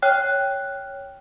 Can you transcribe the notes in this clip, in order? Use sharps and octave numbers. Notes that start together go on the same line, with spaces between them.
C#5 G5 F6 F#6